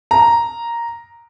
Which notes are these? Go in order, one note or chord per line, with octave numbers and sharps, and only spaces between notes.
A#5